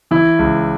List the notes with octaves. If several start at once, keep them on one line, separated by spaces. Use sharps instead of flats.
E3 E4
C#2